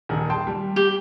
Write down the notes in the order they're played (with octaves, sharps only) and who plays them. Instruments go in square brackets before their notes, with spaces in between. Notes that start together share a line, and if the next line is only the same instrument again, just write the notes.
[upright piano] D#1 D#3
G5 A5 C6
G3
[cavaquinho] G4